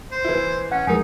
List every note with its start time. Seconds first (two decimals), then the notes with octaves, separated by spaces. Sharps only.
0.12 C5
0.25 E3 E4
0.72 C#4 F#5
0.87 F2 G#3 D#4 A#4 G#5